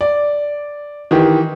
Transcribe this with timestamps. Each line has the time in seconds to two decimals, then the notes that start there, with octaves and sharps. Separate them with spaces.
0.01 D5
1.11 D#3 E3 G4